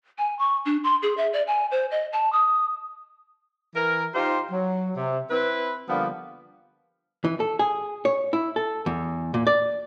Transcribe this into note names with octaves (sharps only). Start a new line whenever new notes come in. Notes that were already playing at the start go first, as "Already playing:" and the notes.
G#5
C#6
D4
C6
G#4
E5
D5
G#5
C5
D#5
A5
D#6
E3 A#4
D#4 F4 G4 C5
F#3
C3
C4 E4 B4
D3 F3 G3 A#3 B3
E3
A4
G#4
C#5
E4
A4
E2
A#2
D5